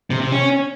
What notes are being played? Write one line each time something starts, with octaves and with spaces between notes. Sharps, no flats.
C3
C3
C#4